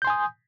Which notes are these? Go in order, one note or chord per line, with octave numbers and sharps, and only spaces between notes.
G#5 C6 D#6 G6